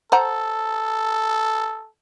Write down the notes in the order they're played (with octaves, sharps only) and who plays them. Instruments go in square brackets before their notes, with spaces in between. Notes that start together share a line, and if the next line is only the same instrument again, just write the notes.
[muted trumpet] A4 [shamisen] C5 F#5 A#5